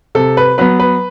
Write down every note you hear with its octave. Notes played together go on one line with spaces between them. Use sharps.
C3 A4
B4
F#3 B3 B4
B4